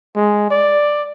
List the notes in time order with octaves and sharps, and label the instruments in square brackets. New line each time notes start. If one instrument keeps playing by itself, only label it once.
[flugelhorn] G#3
D5